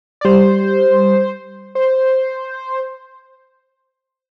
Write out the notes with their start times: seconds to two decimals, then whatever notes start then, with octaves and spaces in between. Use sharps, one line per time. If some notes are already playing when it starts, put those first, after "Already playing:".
0.21 D5
0.25 G3 C5
1.75 C5